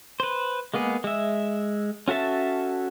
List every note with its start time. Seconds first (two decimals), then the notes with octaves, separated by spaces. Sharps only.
0.20 B4 C5
0.74 G#3 A#3 B3 G#4
1.04 G#3 E5
2.08 C#4 F#4 A4 E5 A5